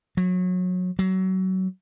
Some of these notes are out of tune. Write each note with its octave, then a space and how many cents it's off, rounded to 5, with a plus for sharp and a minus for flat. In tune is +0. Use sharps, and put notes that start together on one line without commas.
F#3 -25
F#3 +25